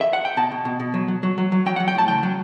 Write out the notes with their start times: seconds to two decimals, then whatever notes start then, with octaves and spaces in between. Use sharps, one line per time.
0.01 E5
0.13 F#5
0.25 G5
0.37 B2 A5
0.51 B2
0.65 B2
0.80 B2
0.94 F#3
1.08 F#3
1.23 F#3
1.38 F#3
1.52 F#3
1.66 F#3 G5
1.76 F#5
1.80 F#3
1.88 G5
1.95 A2 A5
2.08 C#3 G5
2.23 F#3